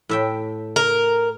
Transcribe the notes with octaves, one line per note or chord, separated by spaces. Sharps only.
A2 E5 G5
A#4